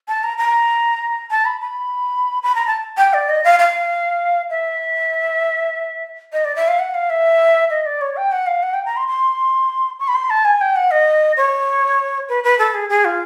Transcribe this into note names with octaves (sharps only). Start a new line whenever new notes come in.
A5
A#5
A#5
A5
B5
B5
B5
A#5
A5
G5
D5
D#5
F5
F5
E5
D#5
D5
E5
F5
F#5
F5
E5
D#5
D5
C#5
G5
F#5
F5
F#5
G5
A#5
C6
C6
C#6
B5
C6
A5
G#5
G5
F#5
D#5
C#5
B4
B4
A4
G#4
G#4
F4